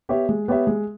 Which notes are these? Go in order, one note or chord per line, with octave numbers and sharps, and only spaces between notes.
B3 G4 C#5 E5
G#3
B3 G4 C#5 E5
G#3